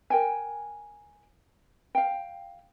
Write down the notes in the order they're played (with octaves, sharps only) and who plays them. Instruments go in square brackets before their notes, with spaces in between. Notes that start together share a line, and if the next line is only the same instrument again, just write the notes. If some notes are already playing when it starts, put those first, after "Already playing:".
[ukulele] A#4 G5 G#5
F5 G5